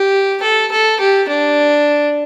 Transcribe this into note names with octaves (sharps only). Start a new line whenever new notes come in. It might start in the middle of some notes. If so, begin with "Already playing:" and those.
Already playing: G4
A4
A4
G4
D4